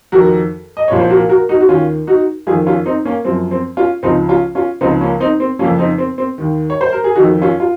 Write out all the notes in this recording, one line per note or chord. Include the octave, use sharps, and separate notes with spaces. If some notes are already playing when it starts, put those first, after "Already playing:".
F2 D#3 F#4 A#4
D#5
C2 A#2 F3 C#5
C5
F#4 A#4
F#4 A#4
D#4 F#4
F#4
D#2 D#3 C#4 F4
D#4 F#4
F2 D#3 F4 G#4
C#4 F4
C4 D#4
A#3 C#4
F#2 F3 C4
C4
C#4 F4
C#2 C#3 F3 C4 D#4
C#4 F4
C#4 F4
C#2 C#3 F3 C4 D#4
A#3 C#4
C4 D#4
C4
F2 C#3 F3 A#3 C#4
C4 D#4
C4
C4
D#2 D#3
C#5
C5
A#4
G#4
F2 D#3 D#4 F#4
C#4 F4
F4